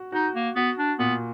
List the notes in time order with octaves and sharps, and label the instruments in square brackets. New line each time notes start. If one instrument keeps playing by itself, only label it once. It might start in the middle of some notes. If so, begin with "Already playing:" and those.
Already playing: [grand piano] F#4
[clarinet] D#4 [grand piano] F#4
[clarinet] A#3
[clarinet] B3 [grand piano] F#4
[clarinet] D4
[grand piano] A#2 [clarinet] B3